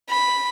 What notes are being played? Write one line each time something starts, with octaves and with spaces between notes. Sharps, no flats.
B5